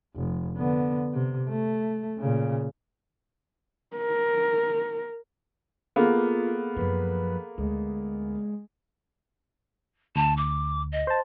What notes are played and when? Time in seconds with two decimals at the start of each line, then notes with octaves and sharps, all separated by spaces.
0.16 F1
0.57 D3 B3
1.14 C3
1.49 A3
2.18 A#2 C#3
3.97 A#4
5.96 A#3 B3 F4 G#4 A4 F5
6.77 F#2 F3 B4
7.58 D2 G#3
10.16 D2 A5
10.37 D6
10.92 D#5
11.07 C5 A5